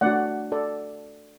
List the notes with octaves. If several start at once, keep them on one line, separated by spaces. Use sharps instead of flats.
A3 D4 F#4 D5 F#5
A4 D5